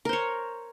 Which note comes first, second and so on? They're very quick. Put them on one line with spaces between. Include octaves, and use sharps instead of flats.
A#4 C5 C#5